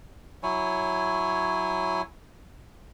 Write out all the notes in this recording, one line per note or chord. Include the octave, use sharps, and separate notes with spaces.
F#3 E4 C#5 G#5